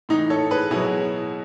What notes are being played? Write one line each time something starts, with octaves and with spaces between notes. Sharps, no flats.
A2 E3 D#4
A4 C#5
G#4 B4
B2 F#3 E4 G#4